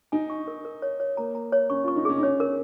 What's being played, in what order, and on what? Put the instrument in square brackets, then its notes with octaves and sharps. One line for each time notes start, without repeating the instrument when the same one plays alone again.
[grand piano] D#4 [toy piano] G#5
[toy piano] C#6
A#4
A#4
C#5
C#5
[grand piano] A#3 [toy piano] A#5
[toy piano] A#5
C#5
[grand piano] C#4 [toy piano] C#6
[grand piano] F4 [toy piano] C#6
[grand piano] D#4
[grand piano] C#4 [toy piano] G#4
[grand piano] D#4
[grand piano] C#4 [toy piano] C#5
[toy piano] A#4